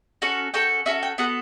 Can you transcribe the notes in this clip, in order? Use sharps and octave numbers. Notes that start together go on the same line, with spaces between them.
C#4 F#4 A4
C#4 F#4 A4 G5
C#4 F#4 A4 E5
G5
B3 F#4 A4 F#5